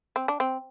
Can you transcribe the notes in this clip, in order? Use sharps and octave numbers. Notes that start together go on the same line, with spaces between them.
C4
D4
C4